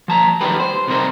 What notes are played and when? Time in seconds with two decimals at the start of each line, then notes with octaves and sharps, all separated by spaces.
0.08 F3 A5 A#5
0.41 D#3 G3 A#3 G4 B4
0.60 C5
0.87 C2 C3 D#3 D4 A#4 C5